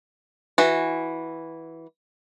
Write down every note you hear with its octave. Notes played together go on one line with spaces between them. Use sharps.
E3 F#4